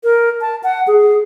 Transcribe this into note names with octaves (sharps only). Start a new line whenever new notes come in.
A#4
A5
F#5
G#4